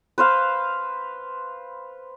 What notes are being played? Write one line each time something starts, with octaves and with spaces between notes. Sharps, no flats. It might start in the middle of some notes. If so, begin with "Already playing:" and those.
B4 C5 F5